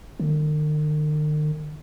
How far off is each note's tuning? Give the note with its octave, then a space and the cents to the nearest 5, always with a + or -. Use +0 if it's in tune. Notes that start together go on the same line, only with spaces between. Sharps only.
D#3 -45